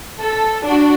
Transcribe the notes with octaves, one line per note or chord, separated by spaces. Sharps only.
A4
D4 F#4